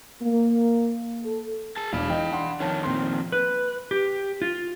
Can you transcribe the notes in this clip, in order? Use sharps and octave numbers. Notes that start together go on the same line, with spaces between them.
A#3
A4
G#4 A5
E1 D4 F5 B5
E3 D#4 G5
D4 F#5 C6
F2 D#3 C#5 A5
A#2 C4 C6
B4
G4
F4